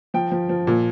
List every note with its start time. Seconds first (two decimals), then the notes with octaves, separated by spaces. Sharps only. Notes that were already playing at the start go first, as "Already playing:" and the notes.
0.14 F3 G5
0.32 F3
0.49 F3
0.67 A#2